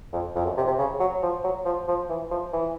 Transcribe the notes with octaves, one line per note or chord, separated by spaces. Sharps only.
F2
F2
F#2
C3
C3
C#3
F#3
F3
F#3
F3
F3
E3
F3
E3